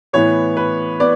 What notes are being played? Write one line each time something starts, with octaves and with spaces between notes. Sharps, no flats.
A2 E3 B3 C#5
B4
B3 D5